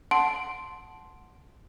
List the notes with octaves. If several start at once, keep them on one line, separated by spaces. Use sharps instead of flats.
F#5 A5 C6 D7